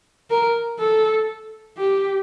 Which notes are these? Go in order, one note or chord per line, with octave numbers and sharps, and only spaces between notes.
A#4
A4
G4